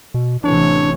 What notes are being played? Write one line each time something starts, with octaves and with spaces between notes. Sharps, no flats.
B2
A1 C3 E3 D4 C#5